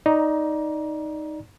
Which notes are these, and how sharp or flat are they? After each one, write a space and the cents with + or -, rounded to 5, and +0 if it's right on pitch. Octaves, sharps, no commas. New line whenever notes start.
D#4 +0 D5 +0 A#5 +20